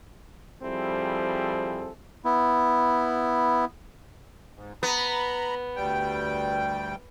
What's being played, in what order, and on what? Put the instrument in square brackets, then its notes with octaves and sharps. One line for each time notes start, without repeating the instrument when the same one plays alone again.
[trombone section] F3 G3 C4 E4 G#4 A4
[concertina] B3 E4
[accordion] G#2
[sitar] B3 [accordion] A#5 B5
[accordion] D2 G3 G5